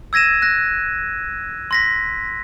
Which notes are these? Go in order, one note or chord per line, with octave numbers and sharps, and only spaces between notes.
E6 G#6 A#6 D#7 E7
F#6 A#6
C6 A#6 B6